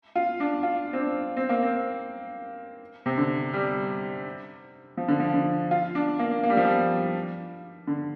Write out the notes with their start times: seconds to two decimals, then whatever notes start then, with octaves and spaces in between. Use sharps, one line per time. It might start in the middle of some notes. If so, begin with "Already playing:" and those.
0.16 F4
0.40 D4
0.63 F4
0.93 C4
1.00 D4
1.37 C4
1.49 A#3
1.62 C4
3.06 C3
3.17 D3
3.53 G3
4.97 F3
5.08 D3
5.20 F3
5.34 D3
5.71 F4
5.95 D4
6.19 A#3
6.43 A#3
6.50 G3
6.57 F3
6.64 G3
7.87 D3